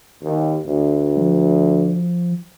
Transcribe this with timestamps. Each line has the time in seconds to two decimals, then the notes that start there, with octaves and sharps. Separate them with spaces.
0.21 D#2
0.66 D2
1.17 F3